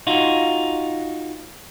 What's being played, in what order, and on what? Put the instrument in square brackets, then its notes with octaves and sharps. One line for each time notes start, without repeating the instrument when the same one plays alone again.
[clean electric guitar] D#4 F4 F#4